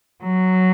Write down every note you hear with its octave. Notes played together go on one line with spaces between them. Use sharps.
F#3